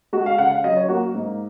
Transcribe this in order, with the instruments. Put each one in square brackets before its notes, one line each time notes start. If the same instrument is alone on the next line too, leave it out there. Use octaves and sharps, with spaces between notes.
[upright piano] G#3 F#4
F5
C#3 F#5
F5
F#3 D#5
C#5
A#3 F#4
G#2